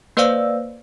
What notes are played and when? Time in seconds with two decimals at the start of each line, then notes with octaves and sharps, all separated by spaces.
0.17 A#3 B4 C5 D5 F5 E6